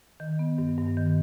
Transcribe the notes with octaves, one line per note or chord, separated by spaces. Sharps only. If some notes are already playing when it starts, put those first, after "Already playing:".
D#3
B3
G2
G2
D#3